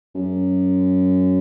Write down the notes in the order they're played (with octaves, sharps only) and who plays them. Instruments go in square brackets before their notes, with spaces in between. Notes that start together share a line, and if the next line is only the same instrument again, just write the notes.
[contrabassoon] F#2